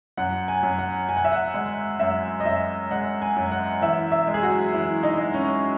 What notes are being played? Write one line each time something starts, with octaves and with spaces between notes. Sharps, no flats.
F#2 F#5
G#5
F#2
F#5
F#2 G#5
F#5
E5
F#5
G#3 F#5
F#2 E5
D#5
F#2 E5
G#3 F#5
G#5
F#2
F#5
E3 E5
E5
G#3
G#4
F#4
E3 E4
D#4
G#3
C#4